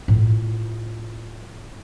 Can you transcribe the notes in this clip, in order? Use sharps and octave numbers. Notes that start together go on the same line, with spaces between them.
A2 F4